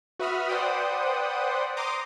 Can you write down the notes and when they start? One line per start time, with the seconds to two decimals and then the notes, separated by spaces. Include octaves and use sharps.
0.19 F#4 B4 E5 B5 D#6 F6
0.48 B4 C5 D5 F#5 G5 D#6
1.77 A#5 C6 D6 D#6